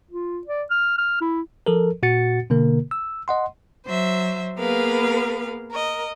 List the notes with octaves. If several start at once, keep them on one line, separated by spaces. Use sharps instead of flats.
F4
D5
F6
F6
E4
F3 A4 A#4
A#2 F#4 F#5 A6 C#7
B2 D3 A#3 A#4
E6
D#5 F#5 C6
F#3 C5 E5
A#3 B3 G#4 A#4 B4 F5
A#4 D#5